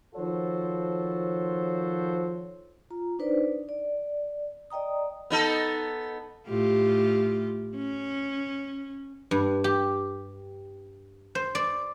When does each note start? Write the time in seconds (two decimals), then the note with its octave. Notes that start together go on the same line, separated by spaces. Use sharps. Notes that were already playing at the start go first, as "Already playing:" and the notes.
0.15 D#3 F3 F#4 A4 C5 C#5
2.90 F4 A#5
3.19 D4 D#4 B4 C5 D5
3.69 D5
4.70 D5 D#5 G5 A#5 D#6
5.30 B3 D#4 A4
6.48 A2 F4 G4
7.76 C#4
9.31 G2
9.64 G4
11.35 C5
11.55 D5